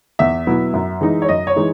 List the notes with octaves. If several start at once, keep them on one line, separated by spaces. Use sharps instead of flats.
E2 E5
B2 F#3 B3 E4
F#2
E3 G#3 D#4
C#5
F#2 D#5
C#5
E3 G#3 D#4